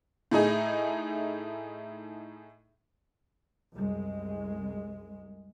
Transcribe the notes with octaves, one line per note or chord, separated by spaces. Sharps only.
A2 A3 D#4 G#4
C2 F#2 G#3